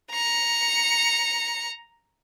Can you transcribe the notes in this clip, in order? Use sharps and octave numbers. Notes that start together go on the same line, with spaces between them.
A#5 C#7